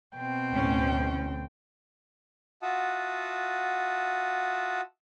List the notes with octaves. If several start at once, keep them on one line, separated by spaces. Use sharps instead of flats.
B2 C4 G5
D2 A2 C#4
F4 F#4 E5 F#5 A5 D#6